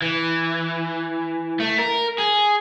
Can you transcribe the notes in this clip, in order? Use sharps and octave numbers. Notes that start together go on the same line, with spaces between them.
E3
A3
A#4
G#4